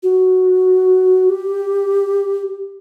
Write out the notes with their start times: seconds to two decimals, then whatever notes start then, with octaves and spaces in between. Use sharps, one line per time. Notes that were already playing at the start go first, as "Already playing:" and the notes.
0.03 F#4
1.29 G4